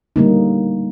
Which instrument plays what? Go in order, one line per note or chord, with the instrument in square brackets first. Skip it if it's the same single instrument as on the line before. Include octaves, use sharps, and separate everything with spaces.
[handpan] D3 G3 A3 A#3 C#4 D#4